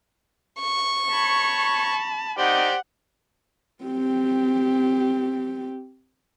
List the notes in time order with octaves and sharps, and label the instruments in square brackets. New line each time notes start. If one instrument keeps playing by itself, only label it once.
[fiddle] C#6
[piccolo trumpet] C#5 [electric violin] A5 B5
[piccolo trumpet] D#4 [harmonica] G4 C5 D5 [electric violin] F#5
[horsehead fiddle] C4 G4